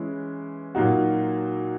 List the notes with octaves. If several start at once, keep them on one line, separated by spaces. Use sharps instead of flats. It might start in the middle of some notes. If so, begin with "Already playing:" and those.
Already playing: E3 G#3 C#4 E4
A#2 F#3 A#3 D#4 F#4